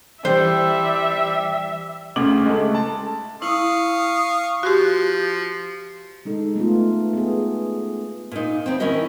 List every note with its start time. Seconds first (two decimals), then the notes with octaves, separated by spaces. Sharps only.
0.25 E3 G3 C5 E5
2.16 D2 C#3 D6 F#7
2.46 G#3 A3 A4
2.74 A5
3.42 E4 F5 C#6 D#6
4.63 F3 F#4 G4
6.25 G#3 D#4 A4
6.56 A3 B3 F4
7.13 B3 G#4
8.31 A#2 D#4
8.66 E2 C4
8.80 D#3 C#4 E4 A#4 D#5